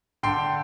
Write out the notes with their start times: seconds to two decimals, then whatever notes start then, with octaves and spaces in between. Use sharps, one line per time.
0.23 D3 G5 C6